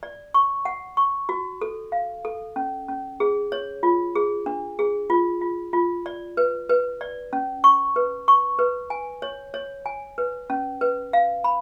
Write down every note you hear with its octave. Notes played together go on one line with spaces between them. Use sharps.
D5
C#6
F#5
C#6
F#4
A4
F5
A4
C#4
C#4
G#4
C#5
F4
G#4
D4
G#4
F4
F4
F4
D5
B4
B4
D5
C#4
C#6
B4
C#6
B4
G#5
C#5
C#5
G#5
B4
C#4
B4
F5
B5